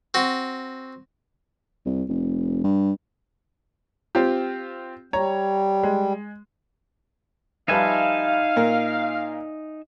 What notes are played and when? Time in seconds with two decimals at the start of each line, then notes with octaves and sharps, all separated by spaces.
0.14 C4 F#4
1.85 C2
2.08 F1
2.63 G2
4.15 C4 F4 G4
5.13 G3 C#5 A#5
5.83 G#3
7.68 F3 G3 D#4 B4 E5 F5 G#5
8.56 A#2 A#4